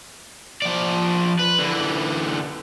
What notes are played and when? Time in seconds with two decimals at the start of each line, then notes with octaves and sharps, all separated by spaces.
0.62 F3 D5
1.39 B4
1.59 D3 E3